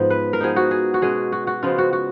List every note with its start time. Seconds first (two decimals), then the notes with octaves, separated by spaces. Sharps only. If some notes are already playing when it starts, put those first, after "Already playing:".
Already playing: G#2 F3 B3
0.10 B4
0.33 A#4
0.40 F3 B3 D#4 G#4
0.56 F#4
0.71 G#4
0.94 F#4
1.02 B2 G#3 C#4 G#4
1.32 F#4
1.47 F#4
1.63 C#3 F3 G#3 B3 F4
1.78 F#4
1.93 F#4